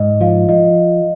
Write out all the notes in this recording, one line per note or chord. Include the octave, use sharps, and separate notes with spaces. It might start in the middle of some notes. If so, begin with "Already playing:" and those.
Already playing: G#2 D#5
F3 F5
F3 D#5